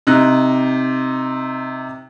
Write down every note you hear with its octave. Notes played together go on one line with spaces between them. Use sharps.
C3 D#4 F#6